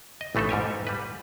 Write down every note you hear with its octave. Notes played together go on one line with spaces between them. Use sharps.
D#5
A1 E3 A3 D#4 A4
G#2 G3 G4 G#5
G3 B4